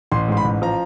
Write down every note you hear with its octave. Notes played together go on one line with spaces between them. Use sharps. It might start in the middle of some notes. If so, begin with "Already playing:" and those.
A1 C6
G#2 C6
B5
A1
F3 A#5